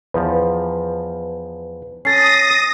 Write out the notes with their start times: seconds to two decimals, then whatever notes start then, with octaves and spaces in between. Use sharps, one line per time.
0.14 E2 F3 B4
2.05 C#4 A4 D#6 A6 A#6 C7